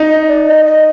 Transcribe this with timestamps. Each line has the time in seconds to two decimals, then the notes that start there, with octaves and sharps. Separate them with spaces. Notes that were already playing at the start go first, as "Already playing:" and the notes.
Already playing: D#4
0.09 D#5
0.28 D5
0.46 D#5
0.65 D#5